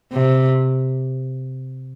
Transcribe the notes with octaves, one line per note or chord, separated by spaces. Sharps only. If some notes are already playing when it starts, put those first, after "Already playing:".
C3